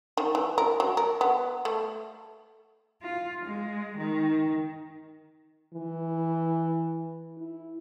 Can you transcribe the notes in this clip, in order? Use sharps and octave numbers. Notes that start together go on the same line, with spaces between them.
D#3
E3
A#4
F#3
A#4
B3
A3
F4
G#3
D#3
E3
E4